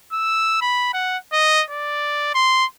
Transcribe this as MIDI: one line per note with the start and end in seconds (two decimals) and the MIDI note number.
0.13 0.57 88
0.61 0.90 83
0.94 1.17 78
1.33 1.63 75
1.71 2.31 74
2.35 2.65 84